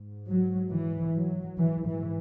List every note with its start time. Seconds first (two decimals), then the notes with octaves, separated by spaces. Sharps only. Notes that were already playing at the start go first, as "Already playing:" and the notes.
Already playing: G#2
0.28 F#3
0.71 E3
1.16 F#3
1.58 G#2 E3
1.87 E3